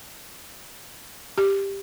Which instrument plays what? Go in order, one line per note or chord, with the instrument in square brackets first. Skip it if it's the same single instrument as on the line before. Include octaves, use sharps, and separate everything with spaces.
[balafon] G4